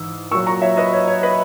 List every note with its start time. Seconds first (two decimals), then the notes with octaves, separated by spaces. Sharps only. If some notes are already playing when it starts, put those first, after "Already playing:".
Already playing: G#2 E3 E6
0.31 A#2 F#3 C#6 E6
0.47 A#5 C#6
0.62 C#5 E5
0.77 B4 D#5
0.93 C#5
1.07 C#5
1.23 B4 D#5